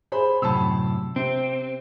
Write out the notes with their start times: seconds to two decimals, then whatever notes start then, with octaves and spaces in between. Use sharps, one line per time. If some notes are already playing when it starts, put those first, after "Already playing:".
0.12 G#4 C5 B5
0.42 F#2 A2 C3 A5 B5 E6
1.16 C3 C4